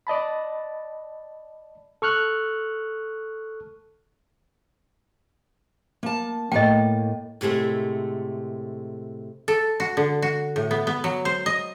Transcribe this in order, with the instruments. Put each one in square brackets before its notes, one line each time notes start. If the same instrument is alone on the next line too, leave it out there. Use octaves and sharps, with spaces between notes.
[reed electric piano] D5 D#5 A5 B5
[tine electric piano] A4 C#6 F6 F#6
[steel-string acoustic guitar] A#3 A5
[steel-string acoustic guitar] A2 A#3 [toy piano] D#5 G5
[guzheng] A2 C3 G#3 A3
[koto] A4
F#4
D3
F#4
A2
B3
B3
F#3
C5
D#5